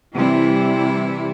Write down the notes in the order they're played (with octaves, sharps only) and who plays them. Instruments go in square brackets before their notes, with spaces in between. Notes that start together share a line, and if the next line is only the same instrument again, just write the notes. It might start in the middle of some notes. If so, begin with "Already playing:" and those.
[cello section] C3 E3 G3 E4